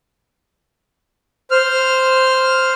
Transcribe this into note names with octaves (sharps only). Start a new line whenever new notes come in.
C5 F6